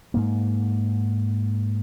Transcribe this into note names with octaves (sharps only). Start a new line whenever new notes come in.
G#2 A#3